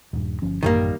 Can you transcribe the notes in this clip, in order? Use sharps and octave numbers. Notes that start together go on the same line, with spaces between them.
D#1 G2
G1 F3 C#4
A1 F#2 C3 D#3 G3 A#3